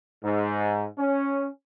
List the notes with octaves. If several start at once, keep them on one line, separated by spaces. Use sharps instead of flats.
G#2
C#4